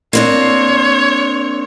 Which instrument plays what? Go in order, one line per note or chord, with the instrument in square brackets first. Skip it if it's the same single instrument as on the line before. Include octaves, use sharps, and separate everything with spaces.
[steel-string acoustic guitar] A#3 C4 D4 [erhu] C#5